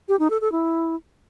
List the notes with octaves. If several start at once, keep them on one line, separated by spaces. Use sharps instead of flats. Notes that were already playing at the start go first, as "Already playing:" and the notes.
G4
D#4
A4
A4
E4